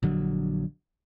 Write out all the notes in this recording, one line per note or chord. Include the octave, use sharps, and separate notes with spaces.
A#1 D3 F#3